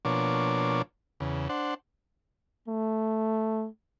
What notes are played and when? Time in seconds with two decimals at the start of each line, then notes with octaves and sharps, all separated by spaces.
0.05 B2 F3 A#3 D4 C#5 D6
1.20 E2 C#3
1.49 D4 C5 F#5
2.68 A3